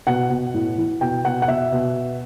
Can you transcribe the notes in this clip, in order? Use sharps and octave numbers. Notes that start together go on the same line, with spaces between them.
B2 F#5
B2
A2
E3
B2 G5
B2 F#5
F#5
B2 E5
B2